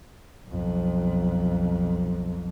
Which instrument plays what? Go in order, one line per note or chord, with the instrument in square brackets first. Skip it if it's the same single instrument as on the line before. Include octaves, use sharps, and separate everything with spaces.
[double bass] B1 F2